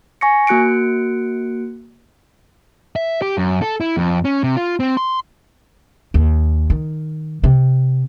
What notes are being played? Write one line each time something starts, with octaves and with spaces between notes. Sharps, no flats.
G#5 C#6 A#6 C#7
A#3 F#4 F#6 C#7 D7
E5
G4
F#2
A4
E4
F2
C#4
C3
F4
C4
C6
D#2
D#3
C3